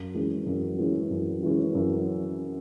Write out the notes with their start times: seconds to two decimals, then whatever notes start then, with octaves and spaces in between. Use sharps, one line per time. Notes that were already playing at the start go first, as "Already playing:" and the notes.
Already playing: F#2
0.14 E3 G#3 C#4
0.46 F#2
0.78 E3 G#3 C#4
1.11 F#2
1.43 E3 G#3 C#4
1.75 F#2